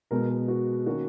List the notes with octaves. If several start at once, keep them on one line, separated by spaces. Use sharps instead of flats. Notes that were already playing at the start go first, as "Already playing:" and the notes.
B2 G#3 B3 A#4
A#4
F#4
D#3 A#3 C#4 F#4